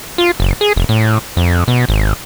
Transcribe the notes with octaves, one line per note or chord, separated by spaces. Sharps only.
F4
F#1
G#4
F1
A2
F2
B2
G#1